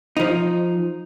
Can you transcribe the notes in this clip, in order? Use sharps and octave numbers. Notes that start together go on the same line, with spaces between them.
F3 D#4